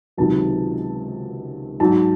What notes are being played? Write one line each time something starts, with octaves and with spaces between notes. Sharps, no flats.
C#2 C3 D#3 F#3 A5
G#2 F#3 A5